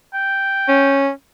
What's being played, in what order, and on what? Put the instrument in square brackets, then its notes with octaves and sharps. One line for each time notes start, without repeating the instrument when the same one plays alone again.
[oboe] G5
[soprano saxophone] C#4